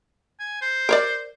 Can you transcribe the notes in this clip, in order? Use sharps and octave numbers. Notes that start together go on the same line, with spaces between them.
G#5
C5
A#4 C#5 D5